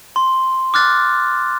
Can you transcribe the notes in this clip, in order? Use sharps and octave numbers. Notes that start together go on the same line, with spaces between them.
C6
D6 F6 F#6 A6